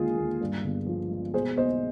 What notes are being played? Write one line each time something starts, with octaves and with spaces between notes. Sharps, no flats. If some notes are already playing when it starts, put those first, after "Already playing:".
Already playing: D#2 D3 G#3 F4 G#4
D#2
G2
G1
F3
G#3
B2 G#4 C5
B1 C5 D#5